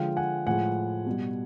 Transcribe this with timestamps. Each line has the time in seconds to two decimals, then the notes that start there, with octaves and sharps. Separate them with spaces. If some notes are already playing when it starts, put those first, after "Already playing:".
Already playing: D3 F3 G#3 F5 G5
0.17 F#5 G#5
0.47 A2 F3 G#3 F#5 G#5
1.06 B2 G3